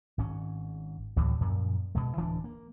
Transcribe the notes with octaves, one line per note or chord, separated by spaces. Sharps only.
G#1 G#2 C#4
D2 A2 E3 F#3
F#2 A#2 F3
B2 G#3
D1 E3 D4
A#3